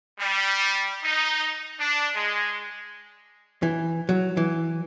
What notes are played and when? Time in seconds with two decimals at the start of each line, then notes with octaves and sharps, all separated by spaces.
0.20 G3
1.04 D#4
1.79 D4
2.15 G#3
3.63 E3
4.09 F#3
4.37 E3